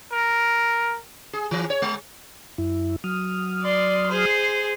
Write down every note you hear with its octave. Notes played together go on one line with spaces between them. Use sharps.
A#4
G#4
E3
C#5
G#3
F#2 E4
F#3 D#6 F6
D5 C6
G#4 C5